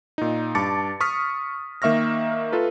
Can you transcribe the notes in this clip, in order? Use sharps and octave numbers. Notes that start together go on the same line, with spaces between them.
A#2 D#4
G2 A5 D6 A6 C#7
C#6 D#6 F6 B6
D#3 A#3 E5 C#6 F6 A#6
F4 A4 B4